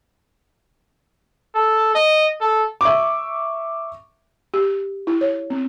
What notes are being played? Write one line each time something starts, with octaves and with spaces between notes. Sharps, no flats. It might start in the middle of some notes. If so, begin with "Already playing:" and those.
A4
D#5
A4
E5 C#6 D6
G4
E4
C#5
C4